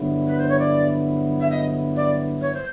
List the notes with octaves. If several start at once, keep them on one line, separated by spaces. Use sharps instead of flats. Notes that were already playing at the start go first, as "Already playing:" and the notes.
Already playing: G2 D3 F#3 B3 E4
B4
C5
C#5
D5
E5
D#5
D5
C#5
C5